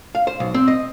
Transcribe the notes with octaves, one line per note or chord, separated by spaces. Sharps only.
F5
C5
B1
C4
D#5